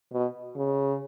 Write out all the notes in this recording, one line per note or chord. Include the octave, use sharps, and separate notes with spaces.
B2
C#3